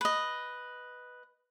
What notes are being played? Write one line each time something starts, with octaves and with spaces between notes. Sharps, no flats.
B4 D#5